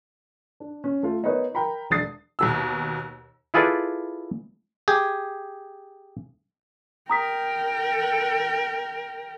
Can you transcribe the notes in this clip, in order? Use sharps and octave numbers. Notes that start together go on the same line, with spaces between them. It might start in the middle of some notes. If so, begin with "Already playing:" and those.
D4
C#4
A3 F4
B3 D#4 A#4 B4 C#5 D#5
A#4 G5 A#5 B5
E1 D4 D#6 A6 C7
D#2 B2 E6
E4 F4 G#4 A4 B4 D5
G4 G#4
A#4 G5 A#5 D#6 B6